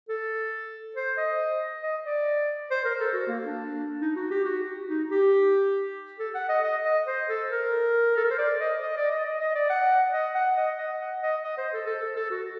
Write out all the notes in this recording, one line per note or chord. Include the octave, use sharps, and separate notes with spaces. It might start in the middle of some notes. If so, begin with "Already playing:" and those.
A4
C5
D#5
D#5
D5
C5
A#4
A4
F#4
A#3
D4
D#4
F#4
G4
F#4
D#4
G4
A4
F#5
D#5
D#5
D#5
C5
A4
A#4
A4
A#4
C5
D5
D#5
D#5
D5
D#5
D#5
D#5
D5
F#5
D#5
F#5
D#5
D#5
F#5
D#5
D#5
C5
A4
A4
A4
A4
F#4